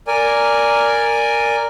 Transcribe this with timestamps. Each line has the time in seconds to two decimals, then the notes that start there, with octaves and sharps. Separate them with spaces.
0.07 A#4 D5 G#5